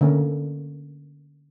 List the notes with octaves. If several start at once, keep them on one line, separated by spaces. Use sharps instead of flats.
D3 A#3 C#4